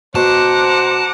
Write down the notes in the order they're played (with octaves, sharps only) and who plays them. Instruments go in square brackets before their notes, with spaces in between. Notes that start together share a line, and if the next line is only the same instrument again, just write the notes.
[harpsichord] B2 [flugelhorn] C5 [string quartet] F#5 A#5 D6 [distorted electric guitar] A5